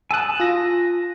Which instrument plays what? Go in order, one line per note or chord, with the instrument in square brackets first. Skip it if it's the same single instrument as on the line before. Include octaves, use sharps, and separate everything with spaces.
[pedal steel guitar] G#5 A5 D#6 [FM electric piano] E6 F#6
[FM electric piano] F4 A#6